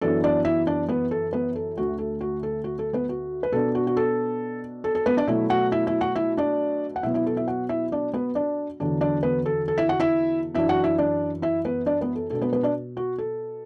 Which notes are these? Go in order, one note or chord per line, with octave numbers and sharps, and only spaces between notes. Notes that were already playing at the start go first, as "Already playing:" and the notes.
F#2 E3 B3 D4 A4
D4 D5
E4 E5
D4 D5
B3 B4
A4
B3 B4
A4
D2 D3 A3 F#4
A4
F#4
A4
F#4
A4
B3 B4
F#4
B4
B2 B3 D4 A4
F#4
F#4
A4
A4
A4
B3 B4
D4 D5
B2 F#3 A3 E4 E5
F#4 F#5
E4 E5
E4 E5
F#4 F#5
E4 E5
D4 D5
F#5
B2 F#3 B3 E4 E5
E4 E5
A4
E4 E5
F#4 F#5
E4 E5
D4 D5
B3 B4
D4 D5
E2 D3 F#3 D4
D4 D5
B3 B4
A4
A4
E4 E5
F#4 F#5
E4 E5
F#2 E3 D4 E4 E5
F#4 F#5
E4 E5
D4 D5
E4 E5
B3 B4
D4 D5
B3 B4
A4
B2 B3 D4 A4
B3 B4
B3 B4
D4 D5
F#4
A4